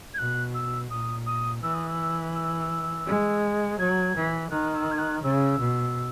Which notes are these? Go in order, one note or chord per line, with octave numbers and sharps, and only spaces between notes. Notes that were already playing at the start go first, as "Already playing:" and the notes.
G#6
B2 F#6
E6
A#2 D#6
D#6
E3 E6
D#6
E6
E6
G#3
F#3 G#6
E3
D#3 F#6
E6
G#6
F#6
C#3 E6
B2